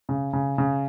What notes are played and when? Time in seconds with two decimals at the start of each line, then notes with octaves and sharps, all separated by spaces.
0.09 C#3
0.33 C#3
0.58 C#3